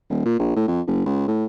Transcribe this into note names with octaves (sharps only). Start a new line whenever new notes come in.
D#1
A#2
A#1
A2
F2
F#1
C#2
A2